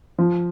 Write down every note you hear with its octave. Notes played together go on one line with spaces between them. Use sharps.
F3